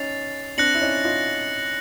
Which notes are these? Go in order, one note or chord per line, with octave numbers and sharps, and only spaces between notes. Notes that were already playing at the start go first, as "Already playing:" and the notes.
Already playing: C#4 D#4 A6 C7 F7
C4 D4 F#6 A#6 C#7 F#7
E4
C#4 D#4
D#4 F4